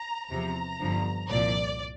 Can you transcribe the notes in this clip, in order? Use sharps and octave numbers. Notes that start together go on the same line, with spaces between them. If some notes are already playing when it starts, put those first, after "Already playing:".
Already playing: A#5
E2 C3 F3 A#5
G1 G2 D3 F3
C2 A#2 F3 D5